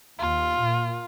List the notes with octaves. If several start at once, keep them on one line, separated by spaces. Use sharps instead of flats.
D#2 F4
A#2